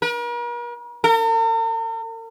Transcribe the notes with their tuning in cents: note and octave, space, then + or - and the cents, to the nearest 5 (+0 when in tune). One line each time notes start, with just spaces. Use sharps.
A#4 +45
A#4 -45